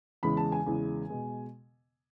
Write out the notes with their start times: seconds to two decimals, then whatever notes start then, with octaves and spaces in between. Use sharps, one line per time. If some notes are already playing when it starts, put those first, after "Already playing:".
0.23 E2 C#3 E3 G#3 B5
0.37 A5
0.52 G#5
0.67 E2 C#3 E3 G#3
1.10 B2 G#3